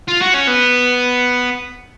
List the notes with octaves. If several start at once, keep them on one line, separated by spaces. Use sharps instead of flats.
F4
F#4
C#4
B3